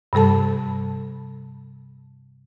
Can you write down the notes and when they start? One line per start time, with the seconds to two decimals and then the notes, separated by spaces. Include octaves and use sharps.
0.13 G2 C3 G3 A4 A5